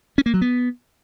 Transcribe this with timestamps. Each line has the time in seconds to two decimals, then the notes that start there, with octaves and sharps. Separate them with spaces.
0.18 C#4
0.26 A#3
0.34 F#3
0.41 B3